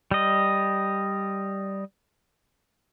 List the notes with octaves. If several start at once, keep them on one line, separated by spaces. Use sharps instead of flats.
G3 D#5